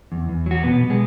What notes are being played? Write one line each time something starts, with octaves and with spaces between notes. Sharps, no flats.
E2
E2
F#3 F#4
B2 B3
B2
G#3